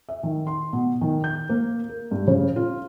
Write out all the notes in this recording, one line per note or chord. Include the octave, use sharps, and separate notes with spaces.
E5
D#3
C6
B2
D#3
G6
A#3
A#4
G2
C#3
F4